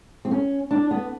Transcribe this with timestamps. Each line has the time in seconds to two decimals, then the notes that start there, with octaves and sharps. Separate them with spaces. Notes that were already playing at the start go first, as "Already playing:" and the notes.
0.25 C4
0.31 C#4
0.71 D4
0.91 B3